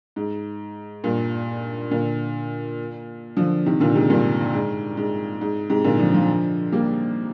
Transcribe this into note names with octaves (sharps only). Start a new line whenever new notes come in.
G#2
G2 A#2
A#2 D3
D3 F3
C3 D#3
A#2 D3
G#2 C3
G2 A#2
G#2
G#2
G#2
G#2 C3
A#2 D3
D3 F3
D3 F3
G3 A#3